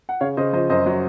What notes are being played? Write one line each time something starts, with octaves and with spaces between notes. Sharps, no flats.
F#5
C#3 C#5 F5
C#3 C5 D#5
F3 C5 D#5
F#2 C5 D#5
F#3